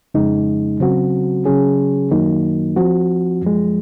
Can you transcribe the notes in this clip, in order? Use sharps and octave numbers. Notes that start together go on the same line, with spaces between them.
F2 C#3 G#3 D#4
C#3 F#3 C4 F#4
C#3 F#3 C#4 G#4
F#2 D#3 F#3 A#3 D#4
F3 C4 F#4
F#2 F3 G#3